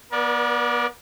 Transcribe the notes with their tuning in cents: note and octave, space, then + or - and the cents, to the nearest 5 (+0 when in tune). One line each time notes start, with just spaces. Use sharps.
B3 -25 A#4 +40 D5 +0